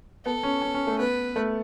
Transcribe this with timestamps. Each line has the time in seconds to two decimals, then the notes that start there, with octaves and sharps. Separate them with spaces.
0.25 B3 A4
0.43 C#4
0.62 C#4
0.74 C#4
0.87 A3
0.99 B3 B4
1.36 A3